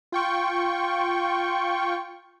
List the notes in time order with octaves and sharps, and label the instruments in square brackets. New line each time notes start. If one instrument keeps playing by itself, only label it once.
[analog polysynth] F4 G5 C#6